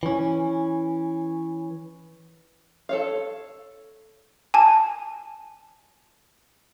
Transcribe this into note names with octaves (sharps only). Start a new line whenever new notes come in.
E3 C#4
A4 C#5 F5
G#5 A5